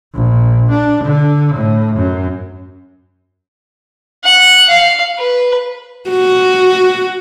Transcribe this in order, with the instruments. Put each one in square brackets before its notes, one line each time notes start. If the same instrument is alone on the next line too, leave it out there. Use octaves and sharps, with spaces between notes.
[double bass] A#1
D4
D3
A2
F#2
[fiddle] F#5
F5
B4
[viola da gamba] F#4